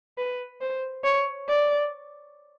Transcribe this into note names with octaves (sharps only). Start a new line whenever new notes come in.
B4
C5
C#5
D5